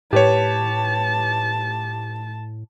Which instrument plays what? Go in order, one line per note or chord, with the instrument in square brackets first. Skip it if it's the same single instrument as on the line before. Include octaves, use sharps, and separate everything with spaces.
[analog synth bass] A2 [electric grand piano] G4 B4 C#5 [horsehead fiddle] A5